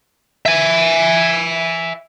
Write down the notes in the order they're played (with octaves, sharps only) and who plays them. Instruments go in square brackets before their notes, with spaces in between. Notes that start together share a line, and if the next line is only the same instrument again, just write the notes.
[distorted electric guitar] E5 G#5